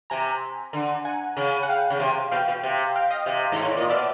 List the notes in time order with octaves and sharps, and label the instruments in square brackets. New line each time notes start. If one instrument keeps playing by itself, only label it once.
[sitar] C3 [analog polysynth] G#5 A#5
[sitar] D3
[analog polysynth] F#5 G#5
[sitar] C#3
[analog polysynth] F#5
F5 G5
[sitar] C#3
C3
[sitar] B2 [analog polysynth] F5 G5
[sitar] B2
C3
[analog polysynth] F5 G5
D#5 F5
[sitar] C3 [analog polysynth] D#5 F5
[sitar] G#2
[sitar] A2 [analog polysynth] C#5
[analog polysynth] D5
[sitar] A#2 [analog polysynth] D#5
[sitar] B2 [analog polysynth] D5 E5